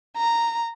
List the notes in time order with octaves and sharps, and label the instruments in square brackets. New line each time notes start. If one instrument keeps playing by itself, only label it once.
[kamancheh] A#5